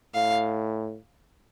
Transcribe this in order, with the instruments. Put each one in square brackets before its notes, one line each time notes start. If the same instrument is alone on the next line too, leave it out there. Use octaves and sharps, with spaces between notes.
[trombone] A2 [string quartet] F5